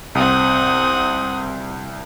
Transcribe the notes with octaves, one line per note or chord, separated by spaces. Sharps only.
C2 C4 F#5 D#6